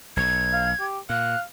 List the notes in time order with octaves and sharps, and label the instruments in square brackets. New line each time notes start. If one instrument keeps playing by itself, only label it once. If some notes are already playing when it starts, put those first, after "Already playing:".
[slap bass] B1 [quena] G#6
[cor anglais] F5
G4
[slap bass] A#2 [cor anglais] F5 [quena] F#6